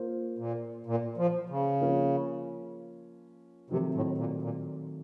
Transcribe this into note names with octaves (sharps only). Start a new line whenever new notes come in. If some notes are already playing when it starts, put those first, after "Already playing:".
Already playing: A#3 F4 C5
A#2
A#2
F3
C#3
F3 A#3 C#4
C3 D#3 F#3 A3 C4 D#4
A2
A#2
A#2